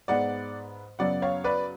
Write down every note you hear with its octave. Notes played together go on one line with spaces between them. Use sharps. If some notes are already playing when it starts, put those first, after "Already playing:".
G#2 G#3 B3 D5 F#5
F#2 C#3 F#3 B3 D5 F#5
C#5 F5
B4 D5